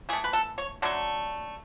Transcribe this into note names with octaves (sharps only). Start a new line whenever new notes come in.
E3 A3 G#4
B4
A4
C#5
D3 F#3 A3